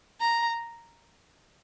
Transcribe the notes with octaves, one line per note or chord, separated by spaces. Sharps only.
A#5